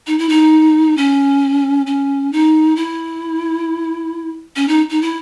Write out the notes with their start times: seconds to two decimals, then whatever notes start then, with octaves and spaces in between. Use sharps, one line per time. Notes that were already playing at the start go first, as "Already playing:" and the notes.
0.07 D#4
0.19 E4
0.29 D#4
0.97 C#4
1.87 C#4
2.32 D#4
2.76 E4
4.56 C#4
4.68 D#4
4.90 D#4
5.02 E4